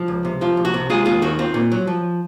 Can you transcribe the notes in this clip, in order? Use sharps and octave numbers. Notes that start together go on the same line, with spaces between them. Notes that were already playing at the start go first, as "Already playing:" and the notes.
Already playing: F3
C#2
C3
F3 F4
C2
F#4
C3
G#3 F4 G#4
D#2 F4 G#4
D#3 F#4
C4 F4
A#2
F#3
F3